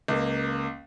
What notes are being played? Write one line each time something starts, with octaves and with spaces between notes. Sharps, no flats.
C#2 A#3